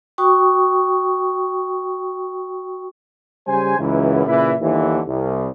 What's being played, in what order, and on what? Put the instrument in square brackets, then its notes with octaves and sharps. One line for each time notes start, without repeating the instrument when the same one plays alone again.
[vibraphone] F#4 G5 C#6 D#6
[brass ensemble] C#3 G3 C5 G#5
C#2 F#2 E3
A#2 C#3 E3 E4 B4 E5
G1 D#2 D3 E3
C2